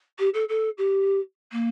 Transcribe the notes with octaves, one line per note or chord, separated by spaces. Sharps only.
G4
A4
A4
G4
A#3